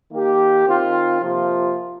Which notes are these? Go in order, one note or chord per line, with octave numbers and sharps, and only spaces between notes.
D#3 A#3 G4
D#3 C4 F4
C3 F3 A#3 F4